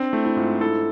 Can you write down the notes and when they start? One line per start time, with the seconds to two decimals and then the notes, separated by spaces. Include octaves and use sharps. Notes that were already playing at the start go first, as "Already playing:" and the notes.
Already playing: C4 D4
0.13 A3 E4
0.25 E4
0.36 G#2 F4
0.61 E4 A4